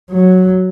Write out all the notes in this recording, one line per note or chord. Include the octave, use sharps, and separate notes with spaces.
F#3